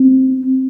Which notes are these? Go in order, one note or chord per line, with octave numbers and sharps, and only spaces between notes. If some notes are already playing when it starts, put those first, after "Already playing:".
Already playing: C4